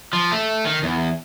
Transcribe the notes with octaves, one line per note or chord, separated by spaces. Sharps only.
F3
A3
D#3
E2